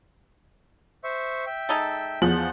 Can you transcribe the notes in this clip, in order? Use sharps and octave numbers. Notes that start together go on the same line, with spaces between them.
C5 E5 C#6
E5 G5
G#3 D#4 A4
E2 F3 F#5 G6 F#7